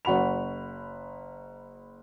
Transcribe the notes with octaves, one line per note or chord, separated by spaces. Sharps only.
F#1 F#4 B5 F7